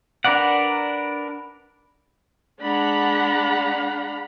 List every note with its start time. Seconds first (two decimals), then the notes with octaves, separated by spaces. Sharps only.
0.24 D4 A#4 B4 D5 F#5
2.61 G#3 D4 F#5 A#5 B5